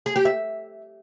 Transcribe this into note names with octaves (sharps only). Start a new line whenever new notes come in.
G#4
G4
E5